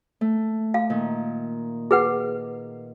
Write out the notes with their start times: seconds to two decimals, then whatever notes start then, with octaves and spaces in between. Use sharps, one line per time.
0.21 A3
0.74 F5
0.90 A#2 D#3
1.91 G#4 B4 F#5